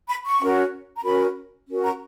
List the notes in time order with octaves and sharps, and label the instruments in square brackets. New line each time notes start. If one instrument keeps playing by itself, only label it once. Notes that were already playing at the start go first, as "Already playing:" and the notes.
[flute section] B5
C#6
C#4 F#4 A#4
A#5
C#4 F#4 A#4 B5
C#4 F#4 A#4
A#5